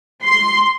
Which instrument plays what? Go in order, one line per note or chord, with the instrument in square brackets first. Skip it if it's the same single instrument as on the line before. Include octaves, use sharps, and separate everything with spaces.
[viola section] C6